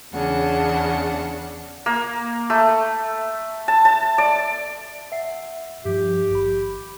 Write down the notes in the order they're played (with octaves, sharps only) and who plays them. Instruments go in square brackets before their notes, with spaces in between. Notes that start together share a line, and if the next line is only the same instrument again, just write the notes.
[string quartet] E2 C#3 D4 F#5
[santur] A#3
A3
A5
A5
D5
[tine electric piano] E5 F#5 C7
[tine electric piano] G2 F3 [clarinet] G4
[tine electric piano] G#1 B5